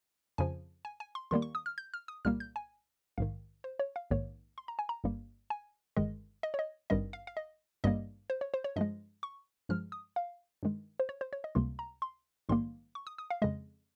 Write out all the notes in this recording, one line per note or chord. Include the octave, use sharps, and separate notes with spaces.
F2 C#3 F3 G#5
G#5
G#5
C6
D#2 D#3 G3 A#3 C6
C#6
D#6
F6
G6
F6
D#6
C2 A#2 G3 A#3 F6
G6
G#5
A#1 G#2 D#3 F5
C5
C#5
F5
A#1 G#2 D#3 A#3 C#5
C6
A#5
G#5
A#5
G1 G2 G3 A#3
G#5
G1 G2 D#3 G#3 D#5
D#5
C#5
D#5
G#1 G2 D#3 G3 D#5
F5
F5
D#5
G#1 G2 G3 A#3 D#5
C5
C#5
C5
C#5
G2 F3 G#3 D#5
C#6
G2 F3 G#3 F6
D#6
F5
G2 D#3 G#3
C5
C#5
C5
C#5
D#5
C#2 C3 G3 A#3 C6
A#5
C6
A#1 G#2 D#3 G3 A#3 C6
C#6
D#6
D#6
F5
F2 C#3 G#3 D#5